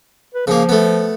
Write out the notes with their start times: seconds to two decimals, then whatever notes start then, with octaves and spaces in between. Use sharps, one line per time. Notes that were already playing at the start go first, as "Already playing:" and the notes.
0.34 B4
0.47 C#3 F3 A#3
0.69 A3 B3